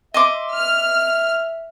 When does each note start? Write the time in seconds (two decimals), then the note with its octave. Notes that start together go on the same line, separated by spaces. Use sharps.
0.14 D#5 E5 C6 D6
0.53 F6